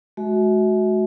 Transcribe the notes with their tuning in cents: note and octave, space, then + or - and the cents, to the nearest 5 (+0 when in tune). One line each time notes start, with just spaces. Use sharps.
G#3 +45 F#4 +0 E5 -30